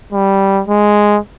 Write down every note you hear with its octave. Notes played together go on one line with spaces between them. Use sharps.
G3
G#3